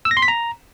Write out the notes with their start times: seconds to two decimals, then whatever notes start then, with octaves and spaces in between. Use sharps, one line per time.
0.05 E6
0.11 A#6
0.17 C6
0.22 B6
0.28 A#5